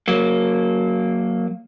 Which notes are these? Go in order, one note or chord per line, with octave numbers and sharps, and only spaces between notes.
F#3 A#3